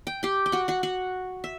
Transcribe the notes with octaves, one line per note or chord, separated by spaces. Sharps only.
G5
G4 G5
G5
F#4 F#5
F#4 F#5
F#4 F#5
E5